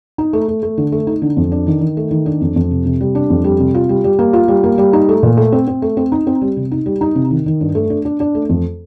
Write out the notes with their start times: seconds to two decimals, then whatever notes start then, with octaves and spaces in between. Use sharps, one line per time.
0.18 D#4
0.33 A3
0.48 A3
0.63 A3
0.78 D3
0.92 A3
1.07 D#4
1.22 D3
1.37 F2
1.52 D4
1.67 D#3
1.81 D#3
1.97 A3
2.11 D#3
2.26 D4
2.41 F2
2.56 F2
2.71 C3
2.86 C3
3.01 G3
3.15 D4
3.30 F2
3.44 G3
3.60 C3
3.74 F4
3.89 G3
4.04 G3
4.19 A#3
4.33 F4
4.48 G3
4.64 A#3
4.78 G3
4.93 D#4
5.09 A3
5.23 A#2
5.37 A3
5.52 C4
5.67 C4
5.82 A3
5.97 C4
6.12 D#4
6.27 C4
6.41 G3
6.57 C3
6.72 D#4
6.86 G3
7.01 D#4
7.15 C3
7.31 D#3
7.46 D#3
7.61 G2
7.75 A3
7.90 D4
8.05 D4
8.20 D4
8.35 A3
8.49 F2